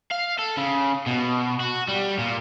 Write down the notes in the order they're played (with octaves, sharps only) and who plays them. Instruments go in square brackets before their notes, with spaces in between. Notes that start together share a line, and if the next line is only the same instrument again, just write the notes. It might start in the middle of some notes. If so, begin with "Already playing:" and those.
[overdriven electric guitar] F5
A4
C#3
B2
F#4
G3
A#2